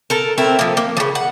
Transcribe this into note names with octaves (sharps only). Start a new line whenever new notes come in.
A4 A#4
A3 C4 E4 A#4
F3 A#3
A#3
C#3 F3
F#5